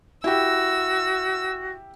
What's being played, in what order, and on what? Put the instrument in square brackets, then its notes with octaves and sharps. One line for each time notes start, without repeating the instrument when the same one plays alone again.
[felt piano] E4 G4 [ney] F#4 [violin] E6